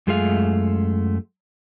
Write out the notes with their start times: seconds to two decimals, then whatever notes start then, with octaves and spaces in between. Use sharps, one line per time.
0.07 F#2 G#3 A3 F4 G#4 F5